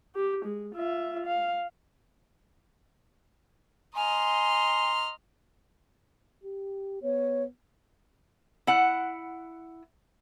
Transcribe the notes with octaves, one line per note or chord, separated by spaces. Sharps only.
G4
G#3
F4 E5
F5
D#5 G#5 A#5 C6 F6
G4
B3 C#5
E4 F#5